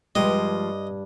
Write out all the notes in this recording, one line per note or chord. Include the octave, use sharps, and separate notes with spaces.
G2 F3 G#3 G4 D#5